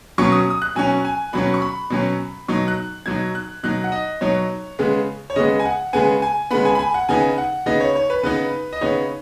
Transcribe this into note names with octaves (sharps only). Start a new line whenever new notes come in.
B2 F#3 C#4 C#6
D#6
D#6
F#6
B2 F#3 C#4 G#5
G#5
B2 F#3 C#4 B5
C#6
B5
B2 F#3 C#4
B2 F#3 D#4 C#6
F#6
B2 F#3 D#4 G#6
F#6
B2 F#3 D#4 F#6
F#5
D#5
B2 F#3 D#4 C#5
C#3 G#3 B3
C#5
C#3 G#3 B3 D#5
G#5
F#5
C#3 G#3 B3 G#5
G#5
C#3 G#3 B3 B5
G#5
B5
G#5
F#5
C#3 B3 D#4 G#5
F#5
C#3 B3 D#4 D#5
C#5
C#5
B4
C#3 B3 D#4 B4
D#5
C#3 B3 D#4 C#5